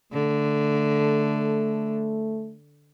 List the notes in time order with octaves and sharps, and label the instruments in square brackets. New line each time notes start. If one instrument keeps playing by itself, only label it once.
[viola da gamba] D3 [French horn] A3